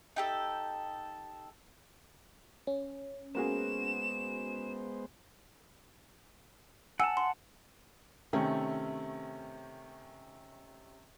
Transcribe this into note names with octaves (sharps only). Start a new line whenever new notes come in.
D#4 G4 A4
C#4
G#3 A#3 B3 F#4 G#4 C5 E7
F#5 G#5 A5 E6
C6
C3 D#3 A3 C#4